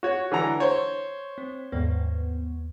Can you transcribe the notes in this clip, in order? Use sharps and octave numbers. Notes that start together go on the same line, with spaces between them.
F#4 C#5
D3 E3 A#5
C5 C#5
C4
D#2 G#2 B3